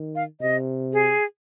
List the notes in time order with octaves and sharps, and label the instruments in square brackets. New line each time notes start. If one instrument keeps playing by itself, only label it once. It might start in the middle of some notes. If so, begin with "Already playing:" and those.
Already playing: [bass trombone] D#3
[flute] F5
[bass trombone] C3 [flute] D#5
[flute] G#4